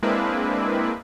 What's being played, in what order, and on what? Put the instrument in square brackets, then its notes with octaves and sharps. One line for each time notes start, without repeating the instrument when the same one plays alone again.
[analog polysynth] G#3 A#3 C4 D4 E4 B4